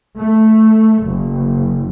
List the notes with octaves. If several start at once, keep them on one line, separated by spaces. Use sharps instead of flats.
A3
F#1